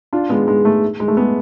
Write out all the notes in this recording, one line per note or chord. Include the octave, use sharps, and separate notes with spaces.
D4 F4
G#3 B3
G#3
A3
G#3
A3
G#3 B3